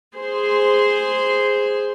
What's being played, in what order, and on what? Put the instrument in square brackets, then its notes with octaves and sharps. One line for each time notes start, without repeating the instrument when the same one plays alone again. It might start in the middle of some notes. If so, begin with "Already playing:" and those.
[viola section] G#4 C5 C6